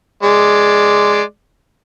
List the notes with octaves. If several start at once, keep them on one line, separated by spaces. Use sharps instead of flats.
G#3 D5